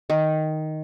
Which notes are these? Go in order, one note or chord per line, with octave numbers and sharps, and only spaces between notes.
D#3